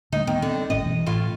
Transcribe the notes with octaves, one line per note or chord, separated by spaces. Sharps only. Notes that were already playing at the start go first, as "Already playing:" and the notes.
D3 G3 A3 D#4
D#3 B3
D3 C4
G#1 A2 C#4 D#5
B2 E3
A2 F4